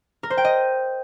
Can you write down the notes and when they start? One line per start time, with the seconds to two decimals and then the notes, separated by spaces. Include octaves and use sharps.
0.23 A#4
0.30 C5
0.37 G5
0.45 D#5